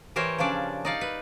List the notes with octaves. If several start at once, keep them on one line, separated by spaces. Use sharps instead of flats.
E3 G4 A#4 C5 C#5
C#3 F3 C#4 D4 D5
D#4 D5 F5
B4